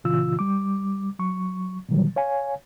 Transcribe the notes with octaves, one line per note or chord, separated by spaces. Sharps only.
A#2 C#3 E3 F4 E6
G3 D6
F#3 C#6
A#2 D3 D#3 F#3 G3
C#5 F5 G#5